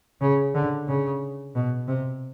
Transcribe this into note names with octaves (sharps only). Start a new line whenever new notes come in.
C#3
D3
C#3
B2
C3